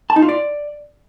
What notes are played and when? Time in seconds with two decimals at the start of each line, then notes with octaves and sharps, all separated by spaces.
0.10 A5
0.16 D#4
0.22 F4
0.29 D5